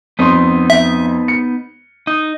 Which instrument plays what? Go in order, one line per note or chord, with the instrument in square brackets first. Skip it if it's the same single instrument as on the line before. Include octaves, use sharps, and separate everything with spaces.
[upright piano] F2 C6 [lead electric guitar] B3 D#4
[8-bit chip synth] E5
[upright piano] C#7
[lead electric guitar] D#4